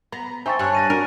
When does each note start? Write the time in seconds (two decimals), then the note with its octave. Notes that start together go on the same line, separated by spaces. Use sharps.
0.12 B3 A#5
0.46 D#4 C5 E5 G5 G#5 C#6 A6
0.59 G2 C#5 F#6
0.75 A6 A#6 D#7
0.90 D4 F#4 A#4